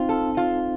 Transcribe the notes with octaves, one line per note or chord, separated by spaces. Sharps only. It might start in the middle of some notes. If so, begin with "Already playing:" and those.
Already playing: C4 D#4 F4
A4
F4